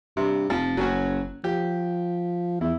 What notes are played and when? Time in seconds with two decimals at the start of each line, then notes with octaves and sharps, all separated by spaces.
0.17 G2 C3
0.50 F1 F3
0.77 F#1 F#3 C#4 F#4
1.44 F3 G4
2.61 E2 E4